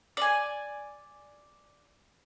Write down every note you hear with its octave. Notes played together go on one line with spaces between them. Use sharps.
D5 G#5